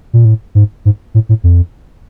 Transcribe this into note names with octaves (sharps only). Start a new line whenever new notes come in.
A#2
A2
G#2
G#2
A2
A2
F2